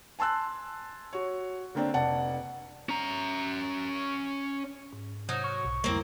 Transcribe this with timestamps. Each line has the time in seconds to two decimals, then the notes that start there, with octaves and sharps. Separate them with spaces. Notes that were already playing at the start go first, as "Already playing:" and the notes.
0.19 G#5 A5 C6 E6 F#6
1.13 F#4 C#5
1.75 D3 A#3 C4 D4
1.94 F1 D5 F#5 A5
2.89 C#4 A#5
4.93 G#2
5.29 C3 F#3 D#4 C5 A#6
5.44 C#6 D#6 F6
5.65 B1
5.84 F2 D3 G3 G#3 A#3 C4 E4